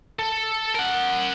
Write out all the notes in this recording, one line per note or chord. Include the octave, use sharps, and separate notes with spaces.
A4
A#4 F#5